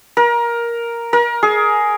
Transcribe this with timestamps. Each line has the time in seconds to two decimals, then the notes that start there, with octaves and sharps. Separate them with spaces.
0.17 A#4
1.13 A#4
1.43 G#4